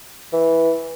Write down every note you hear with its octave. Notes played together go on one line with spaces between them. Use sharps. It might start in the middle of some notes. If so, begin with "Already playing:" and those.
E3